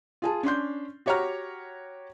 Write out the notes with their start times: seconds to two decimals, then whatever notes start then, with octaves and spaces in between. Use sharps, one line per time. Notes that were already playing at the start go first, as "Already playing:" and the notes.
0.22 F4 G#4 A5
0.43 C#4 D4 C6 G6
1.06 F#4 G4 C#5 F#5 A#5 F6